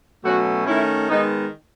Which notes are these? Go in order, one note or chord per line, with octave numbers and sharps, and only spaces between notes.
B2 F#3 A3 C#4 F#4
D#3 A3 C#4 E4
D#3 G#3 B3 D#4